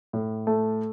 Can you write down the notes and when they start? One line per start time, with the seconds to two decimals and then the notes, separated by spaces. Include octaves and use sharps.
0.13 A2
0.47 A3